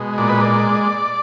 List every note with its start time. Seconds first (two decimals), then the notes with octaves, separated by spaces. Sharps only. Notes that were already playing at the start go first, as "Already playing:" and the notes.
Already playing: B2 G#3
0.18 A#2 D5
0.29 B4
0.41 D5